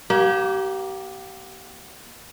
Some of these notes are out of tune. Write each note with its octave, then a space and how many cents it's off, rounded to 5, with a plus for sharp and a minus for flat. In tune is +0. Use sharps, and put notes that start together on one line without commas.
A#3 +20 G4 -30